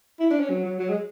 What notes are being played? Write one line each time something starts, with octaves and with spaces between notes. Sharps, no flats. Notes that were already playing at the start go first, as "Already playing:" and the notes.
E4
D4
C#4
F#3
F#3
F#3
G#3